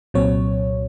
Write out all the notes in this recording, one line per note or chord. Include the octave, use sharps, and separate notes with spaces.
C2 A#2 F#3 C4 C#5